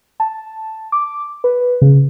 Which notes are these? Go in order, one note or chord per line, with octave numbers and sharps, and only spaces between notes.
A5
D6
B4
C#3